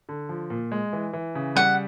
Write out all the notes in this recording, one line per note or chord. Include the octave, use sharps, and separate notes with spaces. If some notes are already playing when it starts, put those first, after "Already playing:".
D3
F3
A#2
G#3
E3
E3
C#3
G3 F#5